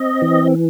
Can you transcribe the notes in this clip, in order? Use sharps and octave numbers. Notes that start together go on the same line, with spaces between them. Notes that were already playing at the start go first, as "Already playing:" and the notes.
Already playing: C4 D#5
E3